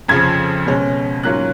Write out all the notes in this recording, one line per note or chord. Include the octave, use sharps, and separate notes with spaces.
F2 C#3 F3 G#6
B2 G#3 C#4
G#2 F#3 A#3 C#4 F4 F#6